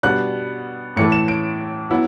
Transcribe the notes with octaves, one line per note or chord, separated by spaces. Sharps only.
B2 G3 B3 D4 F#6
A2 E3 A3 C#7
E7
D7
F#3 B3 E4